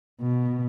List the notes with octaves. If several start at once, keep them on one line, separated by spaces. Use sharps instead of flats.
B2